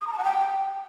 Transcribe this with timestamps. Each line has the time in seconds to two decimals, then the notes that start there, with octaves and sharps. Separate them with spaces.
0.01 D#6
0.07 A#5
0.12 A5
0.18 F#5
0.24 G5